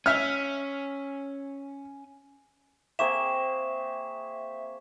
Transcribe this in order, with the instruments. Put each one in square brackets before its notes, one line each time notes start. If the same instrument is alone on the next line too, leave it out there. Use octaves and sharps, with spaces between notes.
[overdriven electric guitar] C#4 [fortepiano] E5 F6
[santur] A#3 C4 G#4 [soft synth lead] E5 [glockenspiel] C#6 E7